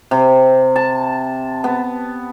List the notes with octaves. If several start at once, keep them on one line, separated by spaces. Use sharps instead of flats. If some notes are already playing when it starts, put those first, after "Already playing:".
C3
A5
B3